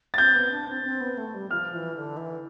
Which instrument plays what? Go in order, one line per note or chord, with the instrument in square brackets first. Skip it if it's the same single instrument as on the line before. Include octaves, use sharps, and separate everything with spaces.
[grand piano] A6
[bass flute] C4 [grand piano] G6
[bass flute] B3
D4
C4
C4
B3
A3
G3
[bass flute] F3 [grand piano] F6
[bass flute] E3
D3
E3